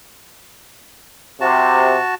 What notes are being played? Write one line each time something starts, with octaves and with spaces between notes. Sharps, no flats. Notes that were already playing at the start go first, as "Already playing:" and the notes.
C3 F#4 A5